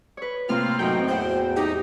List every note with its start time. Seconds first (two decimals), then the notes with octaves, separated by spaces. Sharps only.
0.17 B4 C#5
0.49 A2 C3 A#3 C4 F4 F6
0.79 F#2 A2 D#3 B3 D#4 G5
1.08 E2 C5 F#5 G6
1.57 D#4 G4